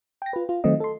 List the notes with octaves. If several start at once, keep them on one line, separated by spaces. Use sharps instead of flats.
G5 A#6
F4 B4
F4
D#3 F#3 A3 C4 D#5
A4 C6